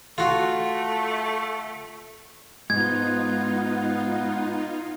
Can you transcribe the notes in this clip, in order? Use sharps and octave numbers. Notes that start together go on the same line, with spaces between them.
A3 F4 F#4
G#2 B3 D#4 F4 G#6